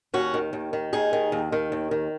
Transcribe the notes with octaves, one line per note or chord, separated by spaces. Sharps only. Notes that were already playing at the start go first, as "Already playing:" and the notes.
D#2 C#4 F#4
D#3
D#2
D#3
D#2 D#4 G#4
D#3
D#2
D#3
D#2
D#3